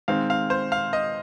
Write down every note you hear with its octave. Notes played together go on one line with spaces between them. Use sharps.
D#3 G#3 C4 F5
F5
C5
F5
D#5